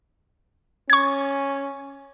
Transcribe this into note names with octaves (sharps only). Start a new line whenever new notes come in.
C#4 C#6 G#6